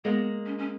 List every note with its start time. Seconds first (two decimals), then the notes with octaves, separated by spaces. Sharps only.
0.05 G#3 A#3 B3
0.46 C#4
0.58 C#4